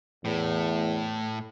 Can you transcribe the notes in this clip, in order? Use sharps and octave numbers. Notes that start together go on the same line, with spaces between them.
E2 A2